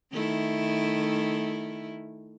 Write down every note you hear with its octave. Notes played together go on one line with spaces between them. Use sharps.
D#3 A3 E4